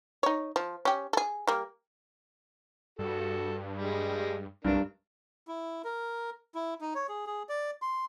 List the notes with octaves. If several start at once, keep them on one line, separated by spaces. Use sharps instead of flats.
D#4 C#5
F3
C#4 G4
G#4 A4
G3 A#3
G2 F#4 A4
G3 G#3
C2 G2 D4 A#4
E4
A#4
E4
D#4
C#5
G#4
G#4
D5
C6